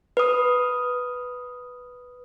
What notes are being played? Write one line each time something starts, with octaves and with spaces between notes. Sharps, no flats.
B4 D#6